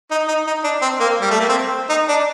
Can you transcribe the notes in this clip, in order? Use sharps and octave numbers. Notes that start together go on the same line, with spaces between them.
D#4
D#4
D#4
D4
C4
A#3
G3
A3
A#3
C4
D#4
D4